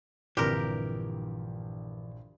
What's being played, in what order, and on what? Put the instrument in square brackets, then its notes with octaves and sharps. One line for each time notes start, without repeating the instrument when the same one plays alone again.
[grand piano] A#1 G2 [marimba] D3 C4 F6 [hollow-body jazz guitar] E3 [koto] G4 A#4